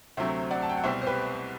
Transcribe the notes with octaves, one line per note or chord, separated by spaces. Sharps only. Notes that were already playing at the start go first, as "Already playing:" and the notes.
D2 C3 F#3 A3 C4 C5 E5
D5 F#5
A5
G5
F#5
C2 B2 G3 C4 C5 E5
C5
G4 B4